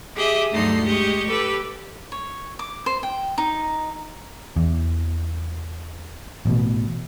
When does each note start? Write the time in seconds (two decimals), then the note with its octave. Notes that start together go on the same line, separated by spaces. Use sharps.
0.15 G4 G#4 D#5 E5
0.52 D2 G2 F#3 D#4 A4 C6
0.84 G#3 G4 D#5 C#6
1.27 G4 A4 B4
2.12 C#5
2.59 D6
2.86 C5
3.03 G5
3.38 D#4
4.56 E2
6.45 A1 B2